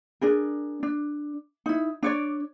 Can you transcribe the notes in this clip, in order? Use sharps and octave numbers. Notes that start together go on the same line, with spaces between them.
D4 G#4 A#4
D4
D#4 E4
D4 C#5 D5